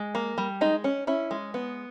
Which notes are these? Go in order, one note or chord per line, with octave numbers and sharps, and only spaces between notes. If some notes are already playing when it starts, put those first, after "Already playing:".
Already playing: G#3
A#3
G3
G#3 D#4
C#4
C#4 E4
G#3
B3